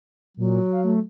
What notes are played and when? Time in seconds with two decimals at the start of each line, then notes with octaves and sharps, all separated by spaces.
0.37 A#2 F#3
0.72 F5
0.84 A3